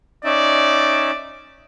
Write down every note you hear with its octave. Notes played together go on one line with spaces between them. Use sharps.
C#4 D#4 D5 E5